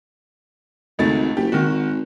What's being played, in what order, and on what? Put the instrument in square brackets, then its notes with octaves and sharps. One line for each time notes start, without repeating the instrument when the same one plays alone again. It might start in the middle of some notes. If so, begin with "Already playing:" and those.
[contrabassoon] G#1 [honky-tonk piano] C#2 A3 A6
[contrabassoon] F#1 [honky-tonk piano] G4
[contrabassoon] G#1 [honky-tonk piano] D#3 F#4